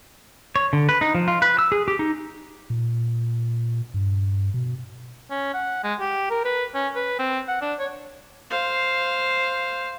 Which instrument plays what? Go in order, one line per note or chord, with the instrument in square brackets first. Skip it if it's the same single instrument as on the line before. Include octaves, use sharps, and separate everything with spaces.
[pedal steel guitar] C#5
D3
B4
D#4
F3
F4
B4
E6
G#4
G4
D#4
[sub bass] A#2
G2
B2
[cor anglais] C#4
F#5
G#3
G4
A#4
B4
C#4
B4
C4
F#5
D4
C#5
[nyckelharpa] C5 F5